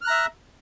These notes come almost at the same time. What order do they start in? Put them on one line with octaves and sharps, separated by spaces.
F6 F#6 A#5 E5